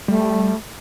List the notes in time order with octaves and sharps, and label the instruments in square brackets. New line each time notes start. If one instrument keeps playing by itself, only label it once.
[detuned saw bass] G3 [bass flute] A3